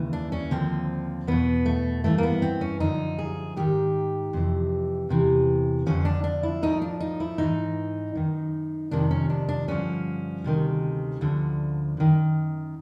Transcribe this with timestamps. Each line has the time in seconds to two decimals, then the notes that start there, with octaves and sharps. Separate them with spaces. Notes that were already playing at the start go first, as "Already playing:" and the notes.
Already playing: D#2 C#3 E3
0.13 D4
0.32 C#4
0.51 D#2 D3 F3 C4
1.27 E2 B2 B3
1.66 A3
2.04 G2 E3 A3
2.18 A#3
2.23 B3
2.42 C4
2.61 C#4
2.80 F#2 D3 F3 D#4
3.19 G#4
3.56 G#2 D#3 G4
4.33 F2 C3 E3
5.09 E2 C3 E3
5.86 F2 D3 F3 C#4
6.05 D4
6.24 D4
6.43 E4
6.62 A2 F3 D#4
6.82 D4
7.00 D#4
7.20 E4
7.38 G#2 E3 D#4
8.15 F#2 D#3
8.91 F2 C3 D#3 D4
9.11 C#4
9.30 D4
9.49 D4
9.68 G2 D3 F3 C#4
10.44 D2 C3 D#3
11.21 D2 D3 F3
11.97 F#2 D#3